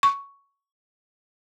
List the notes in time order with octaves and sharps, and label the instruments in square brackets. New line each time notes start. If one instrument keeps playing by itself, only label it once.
[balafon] C#6